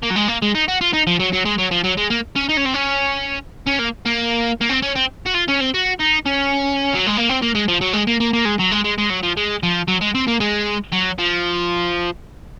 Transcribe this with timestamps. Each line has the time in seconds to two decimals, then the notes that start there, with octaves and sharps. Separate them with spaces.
0.03 A#3
0.11 F#3
0.16 G#3
0.28 A#3
0.42 G#3
0.55 D#4
0.68 F#4
0.81 F4
0.93 D#4
1.07 F3
1.20 F#3
1.33 F#3
1.45 G#3
1.58 F#3
1.71 F3
1.84 F#3
1.97 G#3
2.10 A#3
2.36 C#4
2.49 D#4
2.57 C#4
2.66 C4
2.74 C#4
3.67 C#4
3.79 A#3
4.05 A#3
4.61 A#3
4.69 C4
4.82 C#4
4.95 C4
5.26 F#4
5.34 F4
5.48 C#4
5.60 C4
5.74 F#4
6.00 D#4
6.26 C#4
6.94 F#3
7.06 G#3
7.17 A#3
7.29 C4
7.42 A#3
7.55 G#3
7.68 F3
7.81 F#3
7.93 G#3
8.07 A#3
8.20 A#3
8.33 A#3
8.45 G#3
8.59 F#3
8.71 G#3
8.84 G#3
8.98 G#3
9.10 F#3
9.23 F3
9.37 G#3
9.63 F3
9.88 F#3
10.01 G#3
10.15 C4
10.28 A#3
10.40 G#3
10.92 F#3
11.18 F3